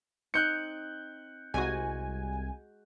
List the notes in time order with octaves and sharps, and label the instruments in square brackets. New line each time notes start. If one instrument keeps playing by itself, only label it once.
[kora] C4 D#4 [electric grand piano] F#6 G6 C#7
[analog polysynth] C2 G#5 [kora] G#3 F#4